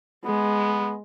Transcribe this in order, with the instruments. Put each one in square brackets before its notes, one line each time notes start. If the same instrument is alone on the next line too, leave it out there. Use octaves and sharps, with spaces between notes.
[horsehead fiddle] G#3 [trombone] B3